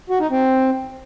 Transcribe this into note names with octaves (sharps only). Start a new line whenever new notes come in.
F#4
D#4
C4